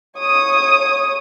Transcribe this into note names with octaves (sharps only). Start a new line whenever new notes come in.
C#5 D#6